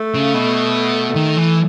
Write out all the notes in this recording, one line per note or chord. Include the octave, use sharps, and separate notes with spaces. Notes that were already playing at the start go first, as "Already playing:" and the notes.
Already playing: A3
C#3
B2
D#3
E3